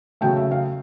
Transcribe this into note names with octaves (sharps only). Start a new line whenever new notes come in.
C#3 F#3 A3 G5
E5
F5